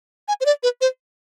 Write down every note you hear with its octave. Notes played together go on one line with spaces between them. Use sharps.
G#5
C5
D5
B4
C5